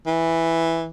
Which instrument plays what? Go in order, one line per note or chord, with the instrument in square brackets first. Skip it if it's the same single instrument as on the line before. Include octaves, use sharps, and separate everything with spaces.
[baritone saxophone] E3